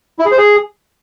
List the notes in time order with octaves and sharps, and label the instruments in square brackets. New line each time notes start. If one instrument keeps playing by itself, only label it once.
[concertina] E4
G#4
C5
G#4